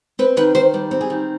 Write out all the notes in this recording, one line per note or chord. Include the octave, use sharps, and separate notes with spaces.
C4 B4
D#3 B4
D#3 C5
G3
C4
G#4
D#3